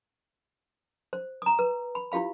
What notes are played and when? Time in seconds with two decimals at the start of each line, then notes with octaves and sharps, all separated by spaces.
1.13 C5
1.42 A#5 D#6
1.59 B4
1.95 B5
2.12 E4 F4 G4 F5 B5